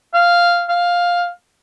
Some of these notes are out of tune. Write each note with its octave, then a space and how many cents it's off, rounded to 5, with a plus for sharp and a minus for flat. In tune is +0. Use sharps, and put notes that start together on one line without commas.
F5 -5
F5 +10